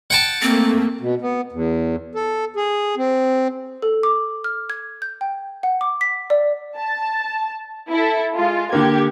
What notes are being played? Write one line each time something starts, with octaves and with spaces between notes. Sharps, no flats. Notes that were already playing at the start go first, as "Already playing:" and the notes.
F#5 G5 A5
A3 A#3 C4
B2
B3
E2
A4
G#4
C4
A4
D6
F6
G#6
G6
G5
F#5
D6
B6
D5
A5
E4 A4
G#3 F4
D3 A#3 G4 G#6